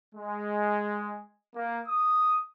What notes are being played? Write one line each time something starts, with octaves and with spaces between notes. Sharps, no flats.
G#3
A#3
D#6